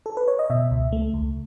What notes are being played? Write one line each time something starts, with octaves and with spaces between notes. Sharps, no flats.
A4
B4
C#5
D#5
B2 E5
C#2
A3
C#2